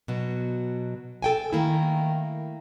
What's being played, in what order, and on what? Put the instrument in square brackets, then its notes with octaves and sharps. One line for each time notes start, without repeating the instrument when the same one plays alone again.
[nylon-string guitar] B2 F#3
A4 G5 G#5
[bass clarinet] D#3 [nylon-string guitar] A3 A#3 E4